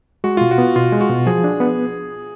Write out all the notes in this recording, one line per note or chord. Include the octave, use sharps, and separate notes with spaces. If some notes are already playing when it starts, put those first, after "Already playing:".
G#3 F#4
B2 F4
F#4
B3
B2 F4
G#3
F#4
B2
F3 G#4
D4
B3